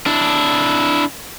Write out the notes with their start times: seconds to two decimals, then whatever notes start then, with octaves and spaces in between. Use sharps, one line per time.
0.06 D4 E4